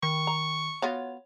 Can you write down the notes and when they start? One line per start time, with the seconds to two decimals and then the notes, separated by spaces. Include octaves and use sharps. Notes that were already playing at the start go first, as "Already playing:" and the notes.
0.03 D#3 C#6
0.27 A#5
0.82 B3 F4 F#4 C#5